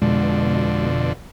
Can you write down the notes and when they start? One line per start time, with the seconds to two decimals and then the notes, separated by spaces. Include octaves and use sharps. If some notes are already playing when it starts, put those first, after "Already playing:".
0.02 F2 B2 D3 G#3